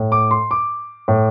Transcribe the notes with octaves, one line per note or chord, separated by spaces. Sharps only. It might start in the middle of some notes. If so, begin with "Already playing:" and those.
Already playing: A2
D6
C6
D6
A2